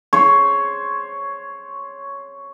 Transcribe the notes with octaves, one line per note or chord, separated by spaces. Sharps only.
C5 C#5